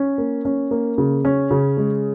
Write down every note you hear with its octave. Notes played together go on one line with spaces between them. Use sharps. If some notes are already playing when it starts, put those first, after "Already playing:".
Already playing: C#4
A#3
C#4
A#3
C#3
C#4
C#3
G#3